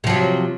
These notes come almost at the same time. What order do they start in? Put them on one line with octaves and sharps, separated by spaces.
C3 F3 F#3